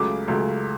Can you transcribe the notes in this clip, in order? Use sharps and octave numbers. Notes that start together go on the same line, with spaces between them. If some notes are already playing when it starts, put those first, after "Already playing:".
Already playing: C#2 C#3 F#3 A3 D6
C#2 C#3 F#3 A3